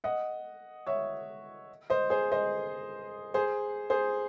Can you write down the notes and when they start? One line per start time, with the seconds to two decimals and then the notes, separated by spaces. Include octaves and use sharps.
0.04 D#5 F#5
0.87 C#5 E5
1.90 C5 D#5
2.10 G#4 C5
2.32 C5 D#5
3.34 G#4 C5
3.90 G#4 C5